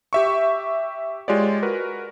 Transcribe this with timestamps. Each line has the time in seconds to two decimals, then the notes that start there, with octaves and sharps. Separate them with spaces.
0.13 G4 E5 C#6
1.28 G#3 F4 G4 C#5 D5
1.62 F#4 A#4 B4